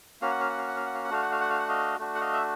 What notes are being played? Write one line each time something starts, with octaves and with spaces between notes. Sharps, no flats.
A#3 C#4 F#4 F5
F#5
F5
F#5
F5
F#5
F5
F#5
F5
F#5
A3 D4 F#4 F5
F#5
F5
F#5
F5
F#5
D#5 F5
A3 D4 F#4
F#5
D#5 F5
E5